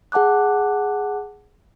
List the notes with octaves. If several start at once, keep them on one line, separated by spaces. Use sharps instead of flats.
G#4 F#5 A5 D6 F#6